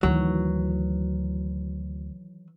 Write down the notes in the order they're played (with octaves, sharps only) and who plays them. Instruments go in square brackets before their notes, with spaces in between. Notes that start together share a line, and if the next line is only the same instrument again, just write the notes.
[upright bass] D2 [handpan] D#3 E3 [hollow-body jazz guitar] F#3